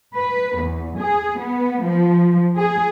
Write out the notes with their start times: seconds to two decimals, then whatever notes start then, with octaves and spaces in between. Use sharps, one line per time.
0.14 B4
0.59 E2
0.99 G#4
1.39 B3
1.84 F3
2.57 G#4